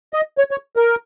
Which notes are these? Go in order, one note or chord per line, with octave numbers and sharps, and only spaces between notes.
D#5
C#5
C#5
A#4